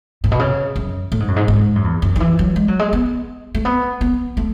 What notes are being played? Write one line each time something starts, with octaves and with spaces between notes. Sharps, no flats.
A2
B2
C#3
F#2
A2
G#2
F#2
G#2
G#2
F#2
E2
F#2
D#3
E3
F#3
G#3
F#3
G#3
B3
A3
B3
B3
A3